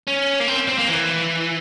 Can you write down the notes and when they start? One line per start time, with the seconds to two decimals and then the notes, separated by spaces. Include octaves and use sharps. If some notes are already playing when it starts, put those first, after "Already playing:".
0.07 C#4
0.40 A#3
0.48 C4
0.68 C4
0.79 A#3
0.89 E3